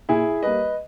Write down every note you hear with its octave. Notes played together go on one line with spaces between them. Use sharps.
A#2 E4 G#4
G3 A#3 B4 D#5